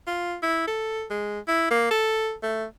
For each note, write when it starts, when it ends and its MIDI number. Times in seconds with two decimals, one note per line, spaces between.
0.07 0.36 65
0.43 0.63 64
0.67 1.05 69
1.10 1.40 56
1.47 1.70 64
1.71 1.89 58
1.91 2.34 69
2.43 2.65 57